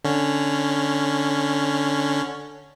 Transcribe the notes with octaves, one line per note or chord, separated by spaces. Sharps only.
D3 C#4